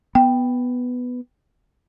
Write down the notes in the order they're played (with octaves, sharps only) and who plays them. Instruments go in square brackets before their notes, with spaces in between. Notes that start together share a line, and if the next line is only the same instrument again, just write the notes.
[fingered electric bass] B3 [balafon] G5